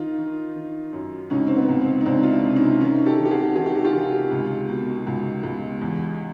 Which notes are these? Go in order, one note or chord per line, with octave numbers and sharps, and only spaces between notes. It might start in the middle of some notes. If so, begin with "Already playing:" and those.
Already playing: D#3 D#4 F4
D#3
D#3
F#2
C#2 C#4 D#4
C4
B3
C#2
C4
D#4
C#2 C4 D4
F4
D4 E4
C3
C#4 D#4
D#3 C#4 D#4
G4 A4
D#3
G4
F#4 G#4
D#3 G#4
G4
F#4
F4 G4
D#3
C#2
B2
C#2
C#2
E2